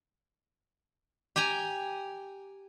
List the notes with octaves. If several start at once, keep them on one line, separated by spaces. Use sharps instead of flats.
G4 G5 G#5 A#5